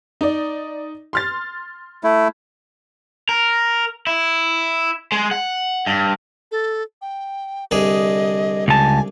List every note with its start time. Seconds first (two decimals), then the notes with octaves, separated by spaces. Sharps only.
0.21 D#4 D5
1.13 C6 F6 A6
2.04 A3 E4
3.29 A#4
4.07 E4
5.12 G#3
5.31 F#5
5.86 G2
6.52 A4
7.02 G5
7.71 C2 D3 G#4 D#5
8.68 C#2 G#5 A5